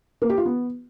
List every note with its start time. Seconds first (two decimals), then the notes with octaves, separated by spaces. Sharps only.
0.22 A#3
0.30 G4
0.38 F4
0.45 B3